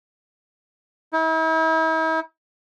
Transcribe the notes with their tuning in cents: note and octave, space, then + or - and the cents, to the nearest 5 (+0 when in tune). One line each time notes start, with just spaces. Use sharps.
E4 -45